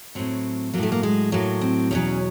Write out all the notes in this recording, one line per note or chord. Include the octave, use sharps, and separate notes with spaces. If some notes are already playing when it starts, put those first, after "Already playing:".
A2 F#3 C4
A2 F#3 A3 A#3
A#3
G#3
A2 F#3 A#3
C4
E2 B2 F#3 C#4